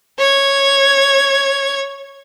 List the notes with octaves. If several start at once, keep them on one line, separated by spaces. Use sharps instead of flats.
C#5 G#6